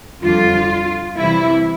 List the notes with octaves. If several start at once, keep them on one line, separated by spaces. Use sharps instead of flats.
F2 D3 G3 F4
C3 E3 G3 E4